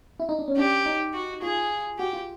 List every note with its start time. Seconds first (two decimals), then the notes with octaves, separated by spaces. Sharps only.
0.20 E4
0.29 D#4
0.39 D4
0.48 C#4
0.56 D4 G4
0.86 D#4
1.13 F#4
1.42 F4 G#4
1.99 F#4 G4
2.13 F4